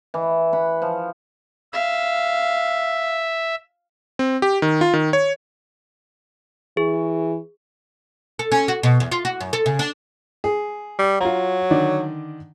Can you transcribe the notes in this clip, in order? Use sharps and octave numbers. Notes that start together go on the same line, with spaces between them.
E3
F#5 B5
F3
E5 F5
C4
G4
D#3
F4
D#3
C#5
E3 G#4
A4
C#4
F#4
B2
E2
F4
F#4
F#2
A4
C#3
D4
G#4
G3
F#3 F4 A#5
D3 D#3 D5